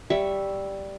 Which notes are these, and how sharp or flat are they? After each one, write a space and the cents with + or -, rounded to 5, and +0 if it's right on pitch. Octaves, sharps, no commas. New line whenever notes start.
G3 +0 C#5 +0 E5 +0